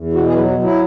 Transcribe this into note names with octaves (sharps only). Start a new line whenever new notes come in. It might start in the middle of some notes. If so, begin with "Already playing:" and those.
Already playing: E2
B2 F#4
G#4
F#3 B4
F#4
F#3
E4